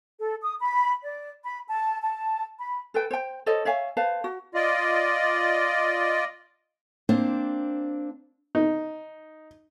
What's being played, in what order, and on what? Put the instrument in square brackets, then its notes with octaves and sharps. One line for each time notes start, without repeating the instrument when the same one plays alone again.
[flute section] A4
D#6
B5
D5
B5
A5
A5
B5
[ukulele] A4 B4 G5
C5 G5
A4 C5 C#5 D#5
C#5 E5 F5 G#5
B4 C5 F5 A5
F#4
[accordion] F4 D5 D#5
[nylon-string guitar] A#3 C4 D4 C5
[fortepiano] D#4